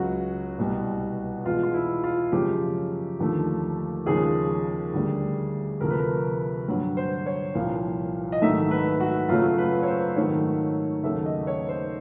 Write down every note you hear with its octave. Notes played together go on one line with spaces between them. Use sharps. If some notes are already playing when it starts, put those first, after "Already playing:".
Already playing: C#2 C#3 F#3 F#4
C2 B2 G3
E2 B2 G#3 F4
F4
E4
F4
F#2 C#3 F3 G#3 G4
D#2 D3 F3 A3
D#2 C#3 F3 G#3 G#4
D2 D3 G3
D2 C3 F3 A3 A#4
B4
A#4
G2 D3 F#3
C5
C#5
C2 A#2 F3 F5
D#5
G#2 D#3 F#3 A3 E5
B4
F#4
F#2 C#3 F#3 A3 F4
B4
C#5
C5
G#2 D#3 F#3 A3 C#5
D#2 C#3 F#3 A3 E5
D#5
C#5
C5